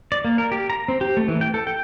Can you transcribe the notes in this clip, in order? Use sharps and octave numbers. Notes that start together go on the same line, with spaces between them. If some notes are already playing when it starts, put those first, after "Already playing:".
D5
A#3
A#4
G4
A#5
C4
G4
A3
E3
G5
A4
G5